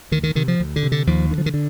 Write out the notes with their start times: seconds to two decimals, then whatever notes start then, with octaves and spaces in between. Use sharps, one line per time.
0.11 D2 D#3
0.23 D#3
0.35 C3 D#3
0.48 F3
0.60 D2
0.76 D3
0.83 C3
0.92 D3
1.07 D#2 F3
1.30 D3 D#3
1.38 F3
1.46 D#3
1.54 D3